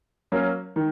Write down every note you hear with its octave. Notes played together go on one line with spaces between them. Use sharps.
F#3 A#3 C#4
D#3